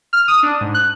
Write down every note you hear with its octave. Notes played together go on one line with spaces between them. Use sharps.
F6
D#6
D4
G#2
F#6